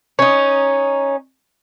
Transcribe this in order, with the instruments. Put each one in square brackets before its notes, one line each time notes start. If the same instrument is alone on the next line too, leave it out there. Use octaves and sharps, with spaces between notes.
[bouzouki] C#4 D#4